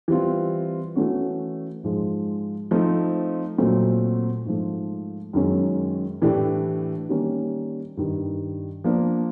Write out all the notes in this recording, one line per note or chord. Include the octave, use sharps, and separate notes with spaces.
E3 G3 C4 F4
E3 A3 C#4 F#4
G#2 F3 G#3
F3 A3 C4 D#4
A#2 F#3 A3 C4
G#2 F3 A3
F#2 D#3 G#3 C#4
A2 E3 A3 D4 G4
D#3 G3 A#3 C#4
G2 D#3 G3
F3 A#3 D4